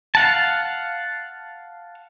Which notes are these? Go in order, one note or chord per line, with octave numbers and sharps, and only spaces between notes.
F5 F#5 A5